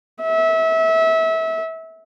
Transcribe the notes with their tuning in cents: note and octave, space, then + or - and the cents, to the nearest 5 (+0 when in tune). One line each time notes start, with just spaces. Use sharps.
E5 -25